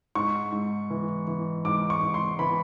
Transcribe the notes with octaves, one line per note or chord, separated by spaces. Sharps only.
G#2 C#6
G#2
E3
E3
G#2 D6
C#6
G#2
C6
E3 B5